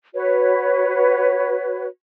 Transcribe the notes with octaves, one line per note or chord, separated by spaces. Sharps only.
F#4 B4 C#5